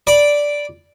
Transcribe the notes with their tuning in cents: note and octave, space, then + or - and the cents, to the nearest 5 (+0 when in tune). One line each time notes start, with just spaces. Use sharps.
D5 -5 B5 -15